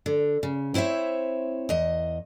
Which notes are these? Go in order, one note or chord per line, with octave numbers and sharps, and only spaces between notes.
D3
C#3
C4 E4 C5 C#5 E5
E2 D#5